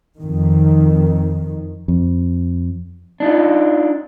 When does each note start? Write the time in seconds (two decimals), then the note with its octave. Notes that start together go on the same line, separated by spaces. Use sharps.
0.18 F2 D#3
1.88 F2
3.20 D4 D#4 F4